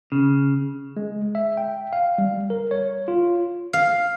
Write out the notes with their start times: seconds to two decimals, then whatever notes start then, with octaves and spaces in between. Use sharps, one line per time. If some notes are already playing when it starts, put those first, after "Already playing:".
0.12 C#3
0.97 G#3
1.35 E5
1.57 G5
1.93 F5
2.18 G3
2.50 A#4
2.71 C#5
3.08 F4
3.73 F5